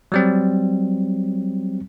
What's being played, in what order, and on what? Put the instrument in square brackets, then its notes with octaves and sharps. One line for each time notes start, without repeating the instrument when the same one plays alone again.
[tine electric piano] F#3 G3 C4